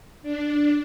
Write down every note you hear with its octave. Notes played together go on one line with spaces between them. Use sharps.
D4